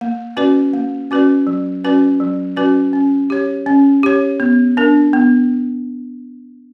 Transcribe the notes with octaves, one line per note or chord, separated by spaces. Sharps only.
A#3
C#4 F#4 B4 D5
A#3
C#4 F#4 B4 D5
F#3
C#4 F#4 B4 D5
F#3
C#4 F#4 B4 D5
C#4
G4 C#5
C#4
G4 C#5
B3
D4 A#4
B3